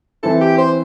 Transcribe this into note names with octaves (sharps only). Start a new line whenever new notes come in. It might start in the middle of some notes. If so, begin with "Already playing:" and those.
E3 C4 E4 A4
G4
C5